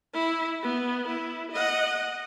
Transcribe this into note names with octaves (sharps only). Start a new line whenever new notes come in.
E4
B3
E4
D#5 F#5